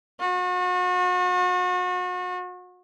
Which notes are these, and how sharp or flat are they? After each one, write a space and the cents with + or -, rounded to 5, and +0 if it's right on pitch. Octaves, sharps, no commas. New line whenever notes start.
F#4 -35